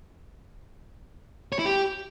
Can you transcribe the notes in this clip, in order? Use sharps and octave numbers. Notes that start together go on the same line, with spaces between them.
C#5
E4
G4